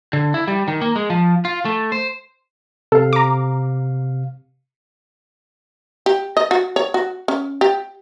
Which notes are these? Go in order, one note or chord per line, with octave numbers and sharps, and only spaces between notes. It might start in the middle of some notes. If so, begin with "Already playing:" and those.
D3
E4
G3
D#3
A#3
G#3
F3
F4
A3
C5
C3 A4 F5
A#5 D6
G4
D#5
F#4
C#5
F#4
C#4
G4